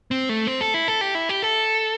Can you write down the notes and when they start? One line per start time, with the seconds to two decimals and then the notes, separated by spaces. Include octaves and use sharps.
0.11 C4
0.29 A3
0.47 C4
0.61 A4
0.74 E4
0.88 A4
1.01 G4
1.15 E4
1.29 G4
1.42 A4